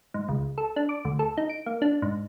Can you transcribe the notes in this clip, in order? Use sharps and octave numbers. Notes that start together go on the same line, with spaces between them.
G#2
C#2
A4
D4
D6
D2
A4
D#4
D7
A#3
D4
G#2